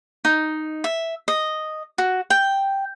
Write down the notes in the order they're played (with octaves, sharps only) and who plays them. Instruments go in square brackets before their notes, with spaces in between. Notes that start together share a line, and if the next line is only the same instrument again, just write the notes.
[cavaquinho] D#4
E5
D#5
F#4
G5